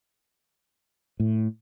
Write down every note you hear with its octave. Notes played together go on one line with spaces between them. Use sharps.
A2